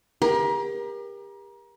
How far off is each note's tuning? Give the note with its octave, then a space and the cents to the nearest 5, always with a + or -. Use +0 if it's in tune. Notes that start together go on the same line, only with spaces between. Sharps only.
G4 +35 A#4 +30